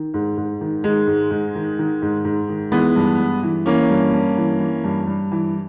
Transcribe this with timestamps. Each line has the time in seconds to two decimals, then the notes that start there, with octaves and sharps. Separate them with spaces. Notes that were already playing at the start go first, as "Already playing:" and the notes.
Already playing: D#3
0.14 G#2
0.37 G#2
0.61 D#3
0.84 D#3 G#3
1.07 G#2
1.31 G#2
1.55 D#3
1.79 D#3
2.02 G#2
2.25 G#2
2.49 D#3
2.72 E3 G#3 B3
2.96 G2
3.19 G2
3.43 E3
3.66 E3 A#3 C#4
3.90 G2
4.14 G2
4.37 E3
4.60 E3
4.84 G2
5.07 G2
5.32 E3